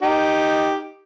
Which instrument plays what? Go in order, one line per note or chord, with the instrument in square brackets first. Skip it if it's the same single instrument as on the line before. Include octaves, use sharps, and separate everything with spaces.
[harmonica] D#4 G4